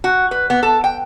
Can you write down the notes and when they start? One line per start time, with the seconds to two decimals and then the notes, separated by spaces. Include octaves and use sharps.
0.04 F#4
0.31 B4
0.50 B3
0.63 A4
0.84 G5